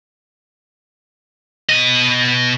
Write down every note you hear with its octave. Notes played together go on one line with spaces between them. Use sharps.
B2 D#5